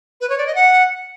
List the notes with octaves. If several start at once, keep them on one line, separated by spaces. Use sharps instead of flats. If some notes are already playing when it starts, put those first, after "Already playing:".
B4
C#5
D5
D#5
F#5